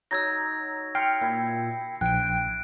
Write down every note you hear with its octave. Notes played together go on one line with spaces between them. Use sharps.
F#3 D#4 E6 G#6 A#6
G5 C6 F6 C7 C#7
A#2 E4
A#1 G5 F#6 D7